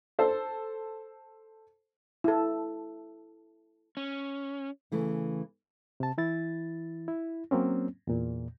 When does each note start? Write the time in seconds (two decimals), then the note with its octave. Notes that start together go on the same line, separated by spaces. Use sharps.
0.19 A4 C5
2.24 E4 A4
3.97 C#4
4.92 C#3 E3 A3
6.00 C3 A5
6.18 E3 E4 A6
7.08 E4
7.51 F#3 A#3 C4 C#4
8.07 E2 A#2